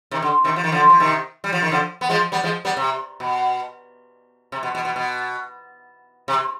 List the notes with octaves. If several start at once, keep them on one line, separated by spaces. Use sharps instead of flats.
C3 D#3
D3
C3 D#3
F3
D#3
D3 F3
F3
C3 D#3
G3
F3
D#3
D3 F3
B3
F3 G#3
G3 B3
F3 G#3
G3 B3
C3
B2
C3
B2
B2
B2
B2
C3